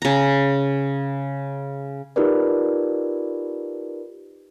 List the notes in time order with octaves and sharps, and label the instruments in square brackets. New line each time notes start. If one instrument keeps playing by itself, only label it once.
[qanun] C#3 A#5
[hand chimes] D#4 F4 G4 A#4 B4 D5